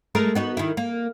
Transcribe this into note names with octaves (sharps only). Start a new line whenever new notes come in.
G#3 A3 A#4
B3 D#4 F#4
D#3 E4
A#3